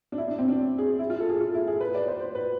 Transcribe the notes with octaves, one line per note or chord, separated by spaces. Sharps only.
D4
E4
D4
C4
D4
G#4
E4
F4
A4
G#4
F4
E4
G#4
B4
D5
C5
C5
B4